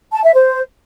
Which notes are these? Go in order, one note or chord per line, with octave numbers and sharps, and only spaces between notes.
A5
E5
C5